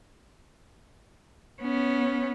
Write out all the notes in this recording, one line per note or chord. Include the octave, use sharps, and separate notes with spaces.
B3 C#4